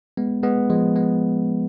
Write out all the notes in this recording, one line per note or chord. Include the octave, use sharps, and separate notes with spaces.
G#3 B3
G#3 B3
F3 G#3
G#3 B3